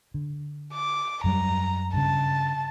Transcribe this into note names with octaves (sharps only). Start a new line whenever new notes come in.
D3
D6
F#2 F#3 G3 A#5
G2 C#3 A5